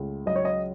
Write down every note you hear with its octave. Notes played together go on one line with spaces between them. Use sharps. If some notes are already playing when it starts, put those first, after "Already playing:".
Already playing: C#2 A3
F#3 D#5
C#5
D#5